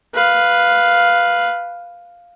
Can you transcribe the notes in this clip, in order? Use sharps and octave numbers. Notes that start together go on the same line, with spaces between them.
B4 F5